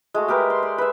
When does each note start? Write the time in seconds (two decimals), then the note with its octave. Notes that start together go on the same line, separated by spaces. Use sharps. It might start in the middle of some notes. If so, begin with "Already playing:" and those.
0.14 G#3 A3 F#4
0.28 G#3 G4 A#4 B4
0.50 C6
0.63 D5
0.78 B4 E5